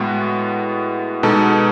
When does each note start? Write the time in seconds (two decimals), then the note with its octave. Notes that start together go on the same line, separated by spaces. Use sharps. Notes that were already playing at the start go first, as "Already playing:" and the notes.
Already playing: A2 G#3 B3 F#4
1.23 B2 G#3 D#4 A4